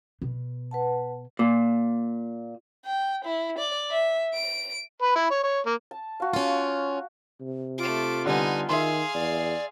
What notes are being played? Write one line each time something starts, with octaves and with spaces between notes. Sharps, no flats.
B2
B4 F#5 A5
A#2
G5
E4
D5
E5
D7
B4
E4
C#5
C#5
A#3
A5
F#4 F5
C#4 F4
C3
A3 F4 D6
D3 G3 B3 D#4 G#5
D#3 G#4 E5 F5 C6
E2 D5